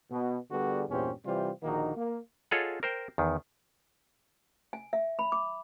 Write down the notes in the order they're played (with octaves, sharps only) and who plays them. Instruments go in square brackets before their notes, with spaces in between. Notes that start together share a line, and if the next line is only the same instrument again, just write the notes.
[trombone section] B2
D3 G3 B3 F#4 G#4
E2 G2 A#2 C#4 G4 C5
C3 E3 G3 F4 G4 C5
A#1 D3 D#3 A#3 D#4 F#4
A#3
[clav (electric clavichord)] F4 G#4 A4 C#5 D#5 F#5
A#4 C5 G5
E2 D#3
[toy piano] G#5
E5
B5
D6